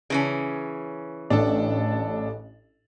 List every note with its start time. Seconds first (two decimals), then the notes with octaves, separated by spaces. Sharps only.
0.10 C#3 E3 C#4
1.30 A1 D4 A4